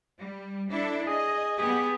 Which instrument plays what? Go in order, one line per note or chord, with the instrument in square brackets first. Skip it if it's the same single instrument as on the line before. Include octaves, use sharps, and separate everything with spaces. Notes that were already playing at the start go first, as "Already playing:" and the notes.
[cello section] G3
D4 E4 A4
[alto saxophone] G#4 [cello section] D#5
[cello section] B3 G4 [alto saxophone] G#4